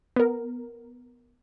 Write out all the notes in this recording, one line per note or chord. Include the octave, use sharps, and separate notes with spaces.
B3 A#4